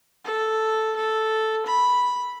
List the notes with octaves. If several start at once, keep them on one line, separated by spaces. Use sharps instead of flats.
A4
A4
B5